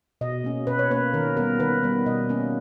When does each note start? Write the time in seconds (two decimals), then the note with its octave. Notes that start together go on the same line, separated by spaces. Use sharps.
0.21 B2 D#5
0.44 A#3 C#4
0.67 B2 B4
0.79 C#5
0.91 A#3 C#4 B4
1.14 D#3 A#4
1.37 G3 B3 A#4
1.60 D#3 B4
1.83 G3 B3
2.06 B2 D#5
2.29 A#3 C#4